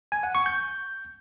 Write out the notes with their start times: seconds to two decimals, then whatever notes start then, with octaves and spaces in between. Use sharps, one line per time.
0.12 G#5
0.23 F#5
0.35 C#6
0.46 G6